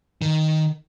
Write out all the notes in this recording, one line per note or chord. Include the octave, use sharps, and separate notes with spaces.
D#3